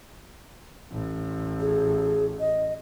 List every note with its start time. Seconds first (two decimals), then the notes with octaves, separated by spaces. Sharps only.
0.92 A1
1.60 G#4
2.40 D#5